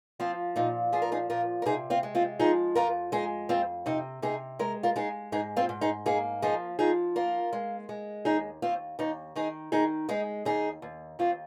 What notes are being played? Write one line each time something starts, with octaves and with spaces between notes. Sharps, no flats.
F3 C4 F4
A#2 D#4
F3 G#4
A#4
D#4 G#4
A#2 F4 A#4
A#4
C3 D#4 G#4
C4 F4
G#3
C4 F4
F3 D#4 G#4
F2 F4 A#4
G#3 D#4 G#4
F2 C4 F4
C3 D#4
C3 D#4 G#4
G#3 A#4
F4 A#4
G#3 D#4 G#4
G#2 D#4 G#4
C4 F4
G#2
D#4 G#4
A#3 D#4 G#4
F3 D#4 G#4
F3 D#4 G#4
A#3 F4 A#4
G#3
G#3
D#2 D#4 G#4
D#2 C4 F4
D#2 D#4
D#3 D#4 G#4
D#3 D#4 G#4
G#3 D#4 G#4
D#2 D#4 G#4
D#2
D#2 C4 F4